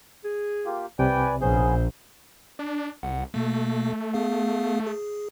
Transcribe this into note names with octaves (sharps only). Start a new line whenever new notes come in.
G#4
A#3 F4 G4
C2 C3 B4 D5 G5 G#5
A#1 B3 C#4 G#4 C5
D4
C2 F#5
B2 A3 A#3
B3 G#4 F5
G#4